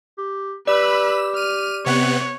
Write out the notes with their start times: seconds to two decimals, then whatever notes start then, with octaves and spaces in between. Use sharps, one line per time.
0.18 G4
0.67 G4 B4 D5 B5 E6
1.36 F6 D#7
1.86 C3 B3 C#5 F#6